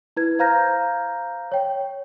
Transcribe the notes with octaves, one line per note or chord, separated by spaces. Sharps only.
E4 B4 G#6
C5 F5 A#5 F6 G6 A#6
C#5 G5